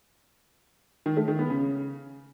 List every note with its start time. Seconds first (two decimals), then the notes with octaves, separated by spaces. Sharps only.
1.06 D#3
1.17 A3
1.28 D#3
1.39 B3
1.50 C#3